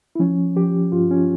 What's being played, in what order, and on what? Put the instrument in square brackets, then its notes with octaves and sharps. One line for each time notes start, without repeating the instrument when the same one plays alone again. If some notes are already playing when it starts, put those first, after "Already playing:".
[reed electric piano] E4
F3 C#4
F3 G4
G2 F4
C#4